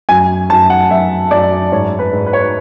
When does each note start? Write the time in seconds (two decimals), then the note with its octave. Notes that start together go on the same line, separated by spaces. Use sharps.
0.09 F#2 G#5
0.50 F#2 A5
0.70 F#5
0.90 F#2 E5
1.31 F#2 D5
1.72 G#2 C#5
1.99 B4
2.13 G#2
2.26 B4
2.33 C#5
2.41 B4